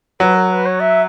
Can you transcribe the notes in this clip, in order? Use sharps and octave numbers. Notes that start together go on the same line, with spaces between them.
F#3 B4
A#4
B4
C#5
E5